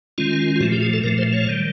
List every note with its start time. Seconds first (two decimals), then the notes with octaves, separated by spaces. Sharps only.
0.18 D#3 G#3 C#4 F4
0.56 F4
0.60 A#2 F3 A3 F#4
0.72 G4
0.82 G#4
0.93 A4
1.04 A#2 F3 A3 A#4
1.18 C5
1.33 C#5
1.49 D#3 G3